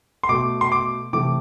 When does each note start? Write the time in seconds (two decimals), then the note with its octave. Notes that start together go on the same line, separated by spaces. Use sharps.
0.23 C6
0.29 B2 A3 D6
0.61 C6
0.72 D6
1.13 C3 E3 A3 D6